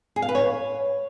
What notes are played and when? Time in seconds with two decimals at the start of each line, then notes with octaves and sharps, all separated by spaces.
0.16 G#4
0.22 F5
0.29 B4
0.35 C#5